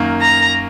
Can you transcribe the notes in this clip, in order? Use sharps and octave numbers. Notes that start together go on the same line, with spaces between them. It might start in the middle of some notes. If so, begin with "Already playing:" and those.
Already playing: F#2 D#3 A#3
A#5